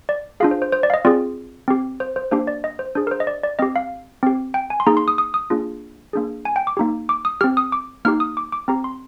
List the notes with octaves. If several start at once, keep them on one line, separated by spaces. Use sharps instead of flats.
D5
D4 F4 G#4 F5
C5
C5
C5
D5
F5
D#5
C4 F4 G#4 D5
C4 G4
C5
C5
A#3 D4 G4 C5
D5
D#5
C5
D4 G#4 C5
A#4
C5
D#5
D5
D5
C4 G4 D#5
F5
C4 G4
G5
G#5
C6
A#3 D#4 G#4 A#5
C6
D#6
D#6
D#6
A#3 D4 F4 G#4
A#3 D4 G#4
G#5
G5
D6
A#3 D#4 G4
D6
D#6
C4 G4 F6
D#6
D6
A#3 D#4 G4 F6
D#6
D6
D6
C4 G4 A#5
C6